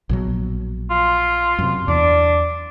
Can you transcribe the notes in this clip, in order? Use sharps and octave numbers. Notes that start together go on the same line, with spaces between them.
A#1 B2 F#3
F4
F#2 C3
E2 D4